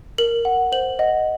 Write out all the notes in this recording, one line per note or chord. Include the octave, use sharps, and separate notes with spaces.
A#4 F#7
F#5
C5 F#7
D#5 F#5